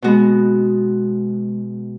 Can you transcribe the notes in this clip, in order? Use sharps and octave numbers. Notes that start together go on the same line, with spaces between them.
B2 G#3 B3 F#4